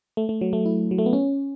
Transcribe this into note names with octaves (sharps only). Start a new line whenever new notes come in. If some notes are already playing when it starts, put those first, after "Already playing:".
A3
A3
F#3
A3
E4
F#3
A3
B3
C#4